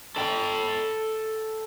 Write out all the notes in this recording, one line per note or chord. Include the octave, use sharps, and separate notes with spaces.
A4 G5